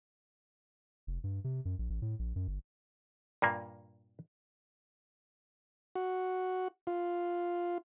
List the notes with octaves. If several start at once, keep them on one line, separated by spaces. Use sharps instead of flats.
F1
G2
C3
F#2
A#1
A1
A2
A#1
F#2
G1
G2 A#2 A#3
F#4
F4